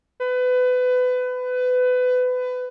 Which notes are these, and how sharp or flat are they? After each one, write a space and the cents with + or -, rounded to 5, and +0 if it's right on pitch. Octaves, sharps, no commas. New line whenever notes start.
B4 +25